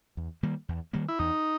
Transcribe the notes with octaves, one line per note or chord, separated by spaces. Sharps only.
E2
D#3 G3 A#3
E2
D#3 G3 A#3
E4
E2 D#4